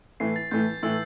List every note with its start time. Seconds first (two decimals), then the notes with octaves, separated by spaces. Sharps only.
0.20 A2 E3 A3 C7
0.36 A6
0.51 A2 E3 A3 G6
0.83 A2 E3 A3 E6